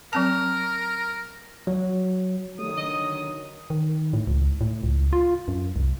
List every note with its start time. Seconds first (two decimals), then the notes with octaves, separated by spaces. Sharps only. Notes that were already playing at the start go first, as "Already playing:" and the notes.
0.13 F#3 C4 A#4 A5
1.67 F#3
2.59 D#3 F#3 G3 A3 D#6
2.77 D3 D#5
3.70 D#3
4.13 A2
4.27 C#2
4.61 A2
4.83 C#2
5.13 F4
5.48 F#2
5.76 C2